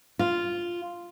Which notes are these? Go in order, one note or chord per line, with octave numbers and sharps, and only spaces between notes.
F4